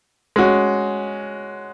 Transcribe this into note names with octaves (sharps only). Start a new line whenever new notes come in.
G#3 C#4 F#4